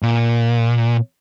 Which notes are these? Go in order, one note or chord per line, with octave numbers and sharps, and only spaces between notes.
A#2